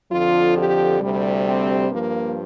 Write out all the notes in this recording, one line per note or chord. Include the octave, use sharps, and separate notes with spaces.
F2 D3 F3 F4
G4
D2 C3 G3
C4
G2 F3 A#3